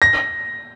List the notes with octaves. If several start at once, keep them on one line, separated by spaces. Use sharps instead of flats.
A#6